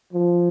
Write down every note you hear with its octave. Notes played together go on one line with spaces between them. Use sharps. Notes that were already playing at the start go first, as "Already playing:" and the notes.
F3